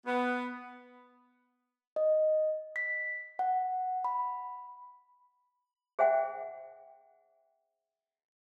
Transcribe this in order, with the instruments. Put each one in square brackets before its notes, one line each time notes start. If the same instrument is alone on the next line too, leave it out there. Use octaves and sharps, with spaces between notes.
[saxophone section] B3
[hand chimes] D#5
B6
F#5
B5
[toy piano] G#4 C5 E5 F#5 G5